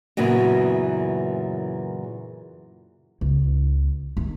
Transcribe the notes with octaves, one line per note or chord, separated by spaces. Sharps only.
F#2 A#2 C#3 E3 B3
C#2
D#3